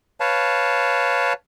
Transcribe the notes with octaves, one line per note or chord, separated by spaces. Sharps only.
B4 C#5 F5 A5